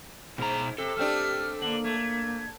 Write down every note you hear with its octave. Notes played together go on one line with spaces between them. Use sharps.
G#2 B2 A#5
C3 A4
A3 C4 D4 G4 F6
D3 A#3 F#7
A3 G#6